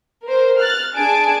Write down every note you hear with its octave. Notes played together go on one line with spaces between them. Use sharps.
A#4 C5
F6 F#6 A6
D4 G#4 G#5 A5 D7